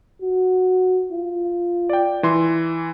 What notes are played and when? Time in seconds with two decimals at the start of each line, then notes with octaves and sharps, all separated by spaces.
0.21 F#4
1.12 F4
1.90 D5 G5
2.23 E3 C6